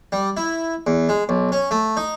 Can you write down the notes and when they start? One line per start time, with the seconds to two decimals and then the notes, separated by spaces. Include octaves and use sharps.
0.12 G3
0.37 E4
0.87 E2
1.09 G#3
1.29 B1
1.52 C#4
1.71 A3
1.97 D#4